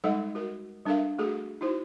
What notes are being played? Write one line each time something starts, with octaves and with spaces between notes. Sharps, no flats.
G3 G#3 D#4 A4 D#5 F#5
F#4 A#4
G3 D4 A4 A#4 E5 F5
A3 F#4 G#4 A4
D#4 E4 F#4 C5